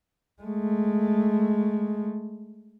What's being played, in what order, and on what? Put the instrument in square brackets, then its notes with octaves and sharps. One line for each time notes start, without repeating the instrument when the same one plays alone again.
[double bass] G#3 A3